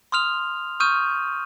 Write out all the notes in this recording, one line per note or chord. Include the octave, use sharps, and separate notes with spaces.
C6 D#6 F6 F7
C#6 D#6 F6 G6 D#7